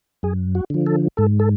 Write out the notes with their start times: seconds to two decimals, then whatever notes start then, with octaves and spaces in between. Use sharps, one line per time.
0.23 F#2 G#4
0.55 F#4
0.70 D3 F3
0.86 A4
1.17 G#2 A4
1.40 A4